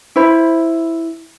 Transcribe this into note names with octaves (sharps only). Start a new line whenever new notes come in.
E4 C5 B5